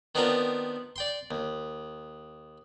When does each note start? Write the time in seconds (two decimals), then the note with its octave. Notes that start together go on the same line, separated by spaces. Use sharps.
0.15 D#3 B3 C4 D4 F4 A#4
0.96 D5 G5 C6
1.31 D#2